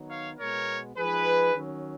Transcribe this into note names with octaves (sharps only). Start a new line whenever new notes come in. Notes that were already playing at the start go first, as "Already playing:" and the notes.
Already playing: D#3 F#3 B3 D#4
C#5 F5
B2 G#3 B3 A#4 C#5
F3 G#3 D#4 G#4 B4
D#3 F#3 C#4